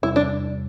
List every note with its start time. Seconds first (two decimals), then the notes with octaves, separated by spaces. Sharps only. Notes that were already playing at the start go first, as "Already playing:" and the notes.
0.02 E2 C3 G3 E4
0.16 D4